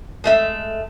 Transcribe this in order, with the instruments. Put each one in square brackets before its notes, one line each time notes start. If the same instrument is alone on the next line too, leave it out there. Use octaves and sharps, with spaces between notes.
[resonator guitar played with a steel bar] G#3 A3 E5